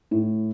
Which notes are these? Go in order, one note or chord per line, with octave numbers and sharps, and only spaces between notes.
A2